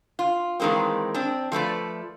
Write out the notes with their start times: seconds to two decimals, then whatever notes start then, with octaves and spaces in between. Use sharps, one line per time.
0.19 F4
0.60 D#3 E3 G#3 A#3 C4
1.14 C4 D4
1.52 F3 A3 B4 D5